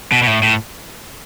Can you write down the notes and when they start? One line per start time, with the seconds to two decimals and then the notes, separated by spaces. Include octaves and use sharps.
0.12 B2
0.23 B2
0.27 A2
0.43 A2